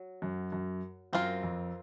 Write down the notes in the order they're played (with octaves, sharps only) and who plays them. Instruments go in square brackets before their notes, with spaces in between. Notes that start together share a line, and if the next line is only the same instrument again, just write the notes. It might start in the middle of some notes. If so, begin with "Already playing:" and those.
Already playing: [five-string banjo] F#3
[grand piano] F#2
F#2
[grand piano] F#2 [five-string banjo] C4 F4 A#4
[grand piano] F2